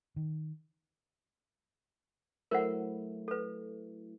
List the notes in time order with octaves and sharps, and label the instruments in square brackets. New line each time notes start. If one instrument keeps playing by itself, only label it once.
[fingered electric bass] D#3
[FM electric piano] F#3 A3 E4 [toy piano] A#4 C5 F#5
[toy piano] A4 B4